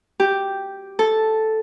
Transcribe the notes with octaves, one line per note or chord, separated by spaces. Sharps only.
G4
A4